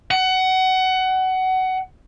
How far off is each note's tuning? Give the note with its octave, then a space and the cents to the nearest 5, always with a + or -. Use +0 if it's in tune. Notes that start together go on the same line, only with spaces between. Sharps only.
F#5 +20